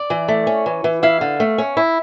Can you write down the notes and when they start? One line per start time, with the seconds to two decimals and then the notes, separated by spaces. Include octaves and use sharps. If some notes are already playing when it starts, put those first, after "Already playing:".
Already playing: D5
0.10 E3
0.28 A3
0.47 C#4
0.66 E3
0.84 E3
1.03 E4 F5
1.21 D3
1.40 A3
1.58 C#4
1.77 E4